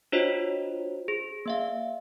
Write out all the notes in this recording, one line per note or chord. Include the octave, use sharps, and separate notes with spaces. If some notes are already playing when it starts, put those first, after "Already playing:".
D4 F4 F#4 C5 C#5 D#5
G#4
A#3 E5 F5